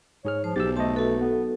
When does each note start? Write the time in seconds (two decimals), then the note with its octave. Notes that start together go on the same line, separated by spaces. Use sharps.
0.25 G#2 G#4 C#5 F6
0.44 F3 C5
0.56 B1 G4 E6 A6
0.76 A3 C5 D#5 A5
0.96 F#4 A4 B4
1.21 B3